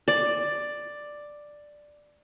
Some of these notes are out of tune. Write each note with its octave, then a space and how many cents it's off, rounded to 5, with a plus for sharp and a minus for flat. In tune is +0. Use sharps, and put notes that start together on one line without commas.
D5 +5